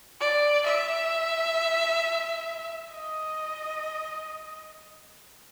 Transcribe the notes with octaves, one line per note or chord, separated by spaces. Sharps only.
D5
E5
D#5